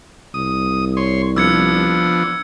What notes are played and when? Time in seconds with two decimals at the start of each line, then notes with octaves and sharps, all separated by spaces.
0.34 C2 D#6
0.97 C#5 C6
1.36 F3 B3 D4 E6 G#6 C#7